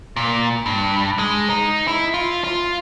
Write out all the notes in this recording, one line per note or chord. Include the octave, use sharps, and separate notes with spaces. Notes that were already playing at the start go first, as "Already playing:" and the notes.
A#2
G2
G#3
D#4
E4
F4
F4